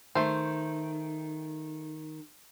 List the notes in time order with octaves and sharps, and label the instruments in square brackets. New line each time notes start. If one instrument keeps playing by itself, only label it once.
[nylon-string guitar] D#3 [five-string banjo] A3 C5